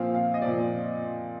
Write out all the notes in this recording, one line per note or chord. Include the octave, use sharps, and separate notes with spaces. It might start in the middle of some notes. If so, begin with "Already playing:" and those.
Already playing: A#2 F3 C4 F5
F5
D#5
A#2 F3 C4 D5